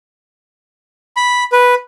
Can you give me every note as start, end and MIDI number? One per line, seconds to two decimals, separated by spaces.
1.17 1.44 83
1.52 1.75 71